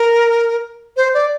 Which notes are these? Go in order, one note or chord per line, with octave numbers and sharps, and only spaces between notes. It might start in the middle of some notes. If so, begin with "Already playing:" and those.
Already playing: A#4
C5
D5